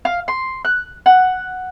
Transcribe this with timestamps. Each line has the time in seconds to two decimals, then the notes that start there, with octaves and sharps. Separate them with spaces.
0.05 F5
0.28 C6
0.65 F#6
1.06 F#5